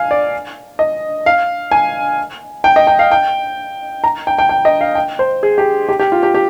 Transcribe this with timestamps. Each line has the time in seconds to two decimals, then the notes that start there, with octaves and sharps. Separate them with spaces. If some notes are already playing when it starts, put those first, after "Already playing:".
Already playing: F5 G#5
0.11 D5
0.79 D#5
1.26 F5
1.72 G#5
2.64 G5
2.76 D#5
2.87 G5
2.99 F5
3.11 G5
4.04 A#5
4.27 G5
4.39 G5
4.49 G5
4.65 D#5
4.81 F5
4.95 G5
5.19 C5
5.43 G#4
5.58 G4
5.89 G4
5.99 G4
6.12 F4
6.23 G4
6.34 G4